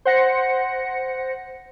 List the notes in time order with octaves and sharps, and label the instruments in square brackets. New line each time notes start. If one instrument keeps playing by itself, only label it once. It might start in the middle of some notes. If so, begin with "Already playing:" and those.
[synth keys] C5 F#5 A#6 C#7